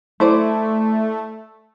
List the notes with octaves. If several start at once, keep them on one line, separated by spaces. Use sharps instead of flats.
A3 E4 C5 D5